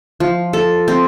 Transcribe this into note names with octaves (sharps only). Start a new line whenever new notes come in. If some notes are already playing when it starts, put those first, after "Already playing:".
F3
A4
C4